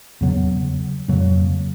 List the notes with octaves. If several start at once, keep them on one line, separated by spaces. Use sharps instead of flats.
E2 C#3 F#3 B3
F2 C#3 F#3 A#3